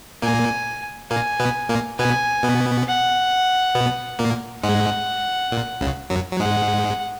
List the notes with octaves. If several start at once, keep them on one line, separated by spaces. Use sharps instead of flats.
A#2 A#3 G#5
A#2 A#3 G#5
B2 B3
A#2 A#3
B2 B3 G#5
B2 B3
F#5
B2 B3
A#2 A#3
G#2 G#3 F#5
A#2
C#2 C#3
F#2 F#3
F#3
G#2 G#3 F#5